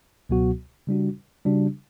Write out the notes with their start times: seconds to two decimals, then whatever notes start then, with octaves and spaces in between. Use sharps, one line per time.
0.29 C#2 B2 F#3 B3 F#4
0.87 C#3 G3 D4 F#4
1.46 C#3 G3 D4 F#4